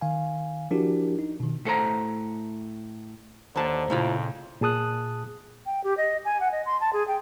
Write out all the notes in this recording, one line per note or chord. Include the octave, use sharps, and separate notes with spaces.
D#3 F5 G#5
F3 D4 E4 F#4 G4 A#4
D#4
B2 D#3
A2 A4 C5 A#5
D#2 D3 C5 A5 A#5
F2 A#2 C#3 A3 E4 F4
A#2 G#4 A5 D#6 F#6
G5
G4
D#5
G#5
F#5
D#5
C6
A5
G#4
G5